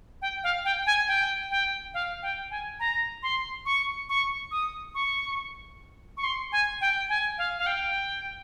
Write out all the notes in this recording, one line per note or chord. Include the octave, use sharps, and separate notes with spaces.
G5
F5
G5
G#5
G5
G5
F5
G5
G#5
A#5
C6
C#6
C#6
D#6
C#6
C#6
C6
G#5
G5
G#5
F5
F5
G5